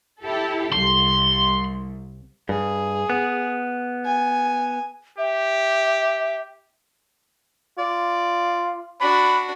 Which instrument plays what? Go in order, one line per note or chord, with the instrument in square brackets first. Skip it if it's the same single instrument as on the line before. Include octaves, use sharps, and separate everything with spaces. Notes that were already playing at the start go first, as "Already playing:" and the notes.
[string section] E4 G4 A4
[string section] C2 [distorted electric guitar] C6
[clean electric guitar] G2 [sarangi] G#4
[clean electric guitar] B3
[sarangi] G#5
[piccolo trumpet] G4 [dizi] E5
[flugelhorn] F4 [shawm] D5
[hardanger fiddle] D4 F#4 [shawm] D5 [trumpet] B5